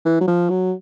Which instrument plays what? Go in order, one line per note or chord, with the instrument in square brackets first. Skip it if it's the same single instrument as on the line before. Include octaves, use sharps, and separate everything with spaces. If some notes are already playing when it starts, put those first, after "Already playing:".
[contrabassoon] E3
F#3
F3
F#3